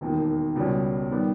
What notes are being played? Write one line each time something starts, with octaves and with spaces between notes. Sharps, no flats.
E1 D#2 D#3
C#2 B2 G3 C#4
D#3 G3 B3